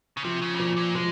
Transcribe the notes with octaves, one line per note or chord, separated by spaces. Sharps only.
C#3
C3 F3
C#3
C3
A#2 F3
A#2
F3 G#3